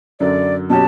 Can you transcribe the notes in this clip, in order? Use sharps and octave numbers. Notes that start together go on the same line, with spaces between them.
F#2 D3 F#3 D5
B2 F#3 C#4 G4 A5